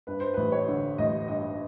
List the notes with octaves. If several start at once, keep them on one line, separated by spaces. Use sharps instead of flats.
G2 B4
C5
A1 B4
C#5
D3
A1 D#5
G2 D#5